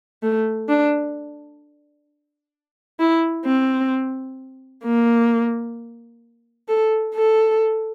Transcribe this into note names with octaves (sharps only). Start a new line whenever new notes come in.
A3
D4
E4
C4
A#3
A4
A4